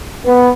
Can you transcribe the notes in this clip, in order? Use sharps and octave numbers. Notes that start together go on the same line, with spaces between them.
B3